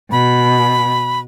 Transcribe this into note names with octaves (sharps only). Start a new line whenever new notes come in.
B2 B5